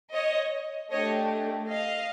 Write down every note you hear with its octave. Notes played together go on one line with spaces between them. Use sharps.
C#5 D#5
A3 D4 G4 C#5 D#5
D#5 F5